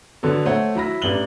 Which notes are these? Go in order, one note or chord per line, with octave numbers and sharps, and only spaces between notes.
D3 F#3 B3 A4
A3 C5 C#5 F#5
F#3 E4 B5 A#6
A1 G3 D4 B4 F#7 G7